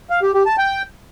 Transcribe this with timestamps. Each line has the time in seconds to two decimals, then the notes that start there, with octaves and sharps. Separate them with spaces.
0.10 F5
0.22 G4
0.34 G4
0.46 A5
0.58 G5